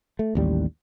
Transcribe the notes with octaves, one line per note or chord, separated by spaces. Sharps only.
A3
A1 D#2 G3